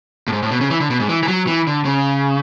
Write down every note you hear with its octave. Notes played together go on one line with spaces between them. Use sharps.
A2
G#2
A2
B2
C#3
E3
D3
B2
G#2
E3
E3
F#3
E3
D3
C#3